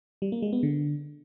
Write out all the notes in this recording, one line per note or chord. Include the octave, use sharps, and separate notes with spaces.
G3
A#3
G#3
B3
D3